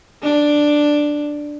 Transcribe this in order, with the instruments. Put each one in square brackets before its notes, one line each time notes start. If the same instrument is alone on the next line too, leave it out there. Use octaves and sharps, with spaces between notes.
[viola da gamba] D4